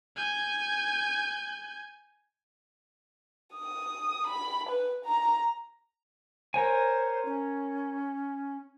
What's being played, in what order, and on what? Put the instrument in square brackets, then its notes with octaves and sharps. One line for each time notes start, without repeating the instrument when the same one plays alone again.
[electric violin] G#5 G6
[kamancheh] D#6
B5
B4
A#5
[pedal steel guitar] A#4 C#5 G#5 [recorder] C5
[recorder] C#4